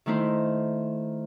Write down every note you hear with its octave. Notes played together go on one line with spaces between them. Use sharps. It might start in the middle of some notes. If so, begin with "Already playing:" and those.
D#3 A3 D#4 E4 C5